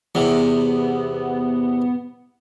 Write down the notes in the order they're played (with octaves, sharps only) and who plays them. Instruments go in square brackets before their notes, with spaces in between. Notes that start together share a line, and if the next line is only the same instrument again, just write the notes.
[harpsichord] E2 C3 [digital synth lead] B3